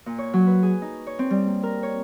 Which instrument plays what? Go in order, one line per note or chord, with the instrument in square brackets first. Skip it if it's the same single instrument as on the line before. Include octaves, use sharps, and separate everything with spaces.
[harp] A#2
C#5
F#3
B4
G#4
D#4
C#5
C4
G3
A#3
A#4
C#5